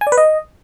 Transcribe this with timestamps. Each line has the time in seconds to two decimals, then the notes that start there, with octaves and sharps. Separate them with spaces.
0.01 G#5
0.07 D5
0.12 B4
0.18 D#5